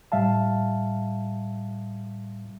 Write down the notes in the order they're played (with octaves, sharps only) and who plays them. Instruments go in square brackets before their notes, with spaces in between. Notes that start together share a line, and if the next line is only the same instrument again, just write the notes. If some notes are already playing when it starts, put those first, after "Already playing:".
[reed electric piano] A2 G3 E5 F5 A5